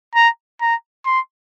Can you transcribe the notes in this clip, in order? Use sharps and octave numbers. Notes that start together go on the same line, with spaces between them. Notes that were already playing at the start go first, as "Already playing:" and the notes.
A#5
A#5
C6